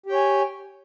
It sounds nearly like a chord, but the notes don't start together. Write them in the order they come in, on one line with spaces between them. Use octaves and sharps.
G4 G5 C#5 G#5